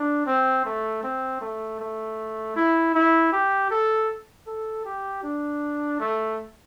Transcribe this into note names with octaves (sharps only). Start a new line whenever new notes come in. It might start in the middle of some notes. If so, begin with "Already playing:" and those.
Already playing: D4
C4
A3
C4
A3
A3
E4
E4
G4
A4
A4
G4
D4
A3